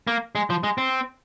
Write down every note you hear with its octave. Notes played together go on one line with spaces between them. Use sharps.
A#3
G#3
F3
G#3
C4